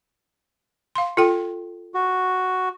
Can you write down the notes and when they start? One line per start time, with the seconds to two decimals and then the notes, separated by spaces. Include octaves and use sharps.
0.96 F5 C6
1.17 F4 A4 G5
1.94 F#4